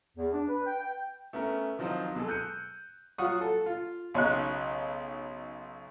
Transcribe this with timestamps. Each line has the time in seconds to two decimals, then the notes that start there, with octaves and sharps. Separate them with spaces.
0.17 E2
0.33 D4
0.48 B4
0.66 G5
0.81 G5
1.33 A3 B3 C#4 A#4
1.79 D#3 F3 F#3 C4 D#4 F4
2.15 B2 F#3 G#3 G#4 A4
2.28 E6 F#6 G6 C#7 D#7
3.18 F#3 F4 F#4 F#5 C#6 D#6
3.41 A4
3.66 F4
4.14 B1 C#3 D#4 C#6 F#6